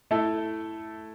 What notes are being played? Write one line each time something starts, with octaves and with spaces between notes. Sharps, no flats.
A3 E4 A4